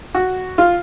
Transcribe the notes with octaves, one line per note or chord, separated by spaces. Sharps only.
F#4
F4